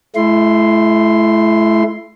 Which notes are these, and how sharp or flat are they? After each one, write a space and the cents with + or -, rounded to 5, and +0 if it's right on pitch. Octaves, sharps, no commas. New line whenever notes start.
A3 -40 E4 +20 C6 +0